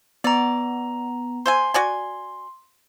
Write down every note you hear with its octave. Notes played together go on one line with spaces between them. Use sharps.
B3 D5 A#5
C5 E5 G#5 C6
F#4 D5 G#5